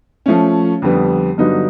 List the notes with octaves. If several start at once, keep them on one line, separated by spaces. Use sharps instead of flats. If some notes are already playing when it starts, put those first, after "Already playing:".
F3 A3 C#4
F2 D3 G3 B3
G2 D3 F#3 B3 D#4